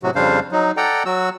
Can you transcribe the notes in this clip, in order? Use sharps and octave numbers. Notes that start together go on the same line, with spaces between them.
A2 C3 F#3 F#4
F2 C#3 G3 D4 C5 F5
F#3 D#4
A4 D5 F#5 G5 A#5
F#3 F#4 E6